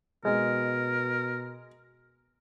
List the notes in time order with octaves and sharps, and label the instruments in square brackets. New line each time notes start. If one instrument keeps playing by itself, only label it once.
[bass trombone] B2 [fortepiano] G#3 [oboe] A#4